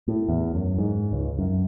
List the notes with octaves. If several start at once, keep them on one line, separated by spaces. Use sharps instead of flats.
A2
E2
F#2
G#2
C#2
F#2